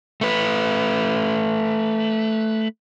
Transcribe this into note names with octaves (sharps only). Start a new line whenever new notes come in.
A3 B4